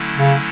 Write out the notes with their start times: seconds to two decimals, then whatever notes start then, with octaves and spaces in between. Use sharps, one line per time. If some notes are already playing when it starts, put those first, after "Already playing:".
Already playing: D3 F#3 A3 C#4 E4
0.16 C#3